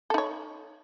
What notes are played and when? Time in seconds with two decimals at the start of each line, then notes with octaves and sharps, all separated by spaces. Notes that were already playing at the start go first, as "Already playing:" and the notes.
0.10 A4
0.14 D#4
0.18 C#5